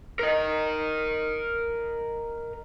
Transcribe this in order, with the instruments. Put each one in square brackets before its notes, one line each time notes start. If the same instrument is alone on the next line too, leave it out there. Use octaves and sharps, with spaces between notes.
[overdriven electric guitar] A#4 D#5